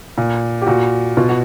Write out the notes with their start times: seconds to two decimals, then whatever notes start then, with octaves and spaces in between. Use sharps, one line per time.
0.18 A#2
0.62 G4
0.67 A#2 F#4
1.17 B2 F4
1.29 F#4